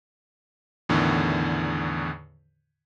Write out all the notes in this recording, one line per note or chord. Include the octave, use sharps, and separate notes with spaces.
E2 A2 D3 D#3